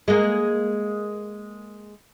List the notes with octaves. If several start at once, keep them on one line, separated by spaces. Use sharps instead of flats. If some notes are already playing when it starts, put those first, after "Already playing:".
G#3 A#3